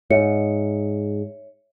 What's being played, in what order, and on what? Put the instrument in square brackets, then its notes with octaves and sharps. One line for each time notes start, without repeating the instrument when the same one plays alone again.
[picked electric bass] G#2 [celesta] C#5 E5 C#7